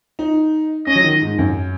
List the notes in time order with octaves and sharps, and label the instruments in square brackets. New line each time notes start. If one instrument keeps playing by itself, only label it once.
[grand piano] D#4
[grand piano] C#4 [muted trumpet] D#5
[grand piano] F#3
D#3
G#2
F#2